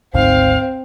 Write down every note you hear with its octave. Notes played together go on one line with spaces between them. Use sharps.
G#1 D2 G#2 C4 F5